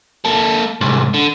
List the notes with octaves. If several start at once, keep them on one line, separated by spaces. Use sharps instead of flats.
A#3 A4
C2 G#2
D3